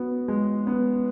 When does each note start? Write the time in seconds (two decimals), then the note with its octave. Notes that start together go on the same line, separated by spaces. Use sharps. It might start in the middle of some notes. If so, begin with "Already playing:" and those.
Already playing: B3 F#4
0.28 G#3
0.67 B3